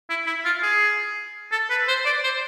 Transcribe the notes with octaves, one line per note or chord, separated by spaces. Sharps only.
E4
E4
F4
G#4
A4
B4
C5
D5
C5